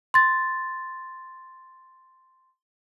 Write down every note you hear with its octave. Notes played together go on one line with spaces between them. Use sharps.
C6 A6